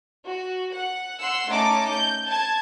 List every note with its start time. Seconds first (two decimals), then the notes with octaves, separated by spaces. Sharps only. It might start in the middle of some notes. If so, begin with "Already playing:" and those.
0.24 F#4
0.71 F#5
1.19 F#5 C6 E6
1.48 A3 C#4 D#4 A5 D6
1.91 G6
2.29 A5 G#6